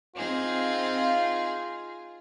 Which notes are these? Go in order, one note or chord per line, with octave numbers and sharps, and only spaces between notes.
C4 D#4 F4 G#4